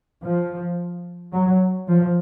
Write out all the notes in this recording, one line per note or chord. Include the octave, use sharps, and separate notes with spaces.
F3
F#3
F3